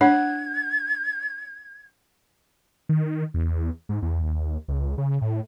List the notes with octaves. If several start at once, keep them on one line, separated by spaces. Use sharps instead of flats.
D4 C#5 F#5 G#6
D#3
E2
G#2
E2
D#2
C#2
C#3
A2